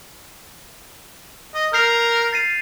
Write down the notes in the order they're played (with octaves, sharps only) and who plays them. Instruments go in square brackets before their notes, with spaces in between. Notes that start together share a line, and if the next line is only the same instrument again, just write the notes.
[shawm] D#5
[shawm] A#4 [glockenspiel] G6 C7 F7
[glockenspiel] A6 C7 D#7